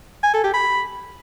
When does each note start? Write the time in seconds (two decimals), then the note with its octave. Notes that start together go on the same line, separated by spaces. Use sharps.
0.23 G#5
0.34 A4
0.44 G4
0.54 B5